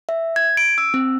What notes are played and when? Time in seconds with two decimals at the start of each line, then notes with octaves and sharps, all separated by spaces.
0.09 E5
0.36 G#6
0.57 D7
0.78 E6
0.94 C4